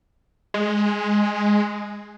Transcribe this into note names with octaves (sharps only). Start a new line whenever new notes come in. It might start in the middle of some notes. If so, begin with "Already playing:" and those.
G#3